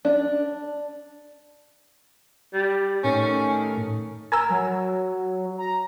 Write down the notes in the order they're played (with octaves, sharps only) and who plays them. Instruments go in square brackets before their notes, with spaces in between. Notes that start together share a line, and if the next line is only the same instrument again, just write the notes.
[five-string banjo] D4
[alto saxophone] G3
[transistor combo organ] A2 [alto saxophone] D#3 [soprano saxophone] C#4
[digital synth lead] A#4 [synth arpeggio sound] G#5 A#5 E6
[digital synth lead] F#3
A#5